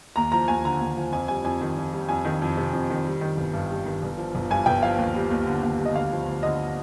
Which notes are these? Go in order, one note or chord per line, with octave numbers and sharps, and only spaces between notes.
D#2 A#5
F3 A#5
D#2 G#5
D3 A#5
D#2
F3
F2 G#5
G3 G#5
F2 G#5
D#3
F2
G3
F2 G#5
D#3
F2
C3
F2
D#3
G3
D#3
G1
G2
G3
D#3
G1
F3
G1
G2 G#5
G1 G5
F3 F5
D#2
G3
D#2
D3
D#2
G3
D#5
D2 F5
F3
D2
D3 D#5